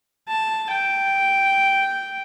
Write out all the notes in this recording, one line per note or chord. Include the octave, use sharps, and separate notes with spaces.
A5
G5